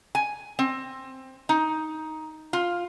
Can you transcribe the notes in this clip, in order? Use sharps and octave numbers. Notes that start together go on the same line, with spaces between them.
G#5
C4
D#4
F4